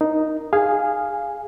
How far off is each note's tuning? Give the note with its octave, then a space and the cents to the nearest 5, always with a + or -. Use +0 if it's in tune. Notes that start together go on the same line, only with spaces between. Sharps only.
D#4 +0 A#4 +0
G#4 -15 F5 +0 G#5 +0